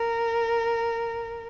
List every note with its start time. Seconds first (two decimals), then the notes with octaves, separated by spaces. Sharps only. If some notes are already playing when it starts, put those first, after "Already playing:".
Already playing: A#4